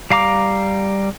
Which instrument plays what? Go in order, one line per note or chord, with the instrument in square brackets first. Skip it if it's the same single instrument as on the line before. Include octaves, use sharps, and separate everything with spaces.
[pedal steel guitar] G3 F5 A#5 D6